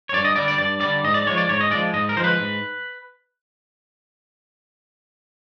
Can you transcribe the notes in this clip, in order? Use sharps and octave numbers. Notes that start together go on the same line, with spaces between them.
C#5
G2 D5
D#5
D3 G3 D5
D5
G2 D5
D3 G3 D5
G#2 D#5
D5
F3 G#3 C#5
D5
G#2 C#5
D#5
F3 G#3 D5
G#2 D#5
A#4
F3 G#3 C5
B4
G#2